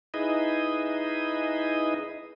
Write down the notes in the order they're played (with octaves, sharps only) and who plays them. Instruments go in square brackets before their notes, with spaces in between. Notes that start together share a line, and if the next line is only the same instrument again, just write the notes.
[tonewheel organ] D#4 E4 G#4 B4 D#5